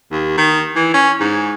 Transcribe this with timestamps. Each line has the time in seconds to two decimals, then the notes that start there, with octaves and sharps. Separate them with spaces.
0.12 D#2
0.37 D#3
0.75 E3
0.94 C#4
1.20 G#2